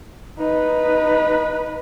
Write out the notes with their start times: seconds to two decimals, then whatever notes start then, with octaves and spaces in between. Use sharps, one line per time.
0.38 D#4 B4